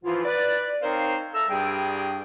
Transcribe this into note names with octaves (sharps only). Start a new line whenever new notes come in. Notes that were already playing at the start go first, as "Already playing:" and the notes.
G#2 E3 F3 E4 F4
B4 D5
C4 D#4 A#4 C5 C#5 F5
A4 E5 A5 A#5 E6
C2 G2 G3 G4 G#4 G5